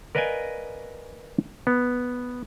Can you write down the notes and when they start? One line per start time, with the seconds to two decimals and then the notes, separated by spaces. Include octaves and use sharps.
0.15 A#4 B4 D5 D#5 F5 G#5
1.67 B3